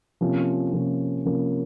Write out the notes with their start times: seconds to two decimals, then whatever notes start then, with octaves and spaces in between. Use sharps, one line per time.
0.21 C3 F3 A#3 C#4
0.73 C3 F3 A#3 C#4
1.25 C3 F3 A#3 C#4